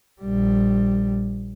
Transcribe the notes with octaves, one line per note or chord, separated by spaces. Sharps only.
A#1 G3